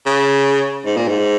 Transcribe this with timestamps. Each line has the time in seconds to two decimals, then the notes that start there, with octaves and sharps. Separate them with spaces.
0.07 C#3
0.85 G#2
0.97 A#2
1.08 G#2